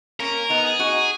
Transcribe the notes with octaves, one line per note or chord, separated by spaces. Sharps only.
A#3 C#4 A#4
B3 D#4
G#4
D#4 F#4